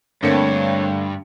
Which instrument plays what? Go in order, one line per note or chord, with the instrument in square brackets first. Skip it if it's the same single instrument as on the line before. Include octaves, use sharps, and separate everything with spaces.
[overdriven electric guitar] G2 [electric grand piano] D3 A3 C#7 [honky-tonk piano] A#3 C4 [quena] C#5